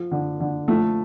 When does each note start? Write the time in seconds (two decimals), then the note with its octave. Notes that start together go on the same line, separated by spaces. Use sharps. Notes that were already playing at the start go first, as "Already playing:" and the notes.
Already playing: F3
0.11 D3
0.40 D3
0.68 F3 A3